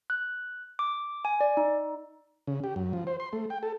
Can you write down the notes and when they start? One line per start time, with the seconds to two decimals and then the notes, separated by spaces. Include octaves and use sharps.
0.10 F#6
0.79 D6
1.25 G#5
1.41 D5
1.57 D#4
2.47 C#3
2.64 G4
2.76 F#2
2.93 F3
3.07 C5
3.20 C6
3.33 A3
3.50 G5
3.63 A4